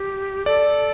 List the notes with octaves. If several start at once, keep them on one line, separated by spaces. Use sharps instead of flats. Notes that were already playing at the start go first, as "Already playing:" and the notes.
Already playing: G4
A4 D5